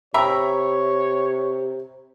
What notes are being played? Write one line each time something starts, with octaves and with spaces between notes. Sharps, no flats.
C3 G4 A#4 C#5 E5 A#5 B5